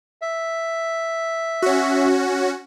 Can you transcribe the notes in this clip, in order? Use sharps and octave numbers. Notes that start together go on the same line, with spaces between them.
E5
C#4 F#4